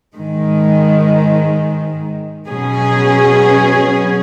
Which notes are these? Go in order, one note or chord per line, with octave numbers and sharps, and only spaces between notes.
G#2 D#3 G#3
B2 F#3 C#4 G#4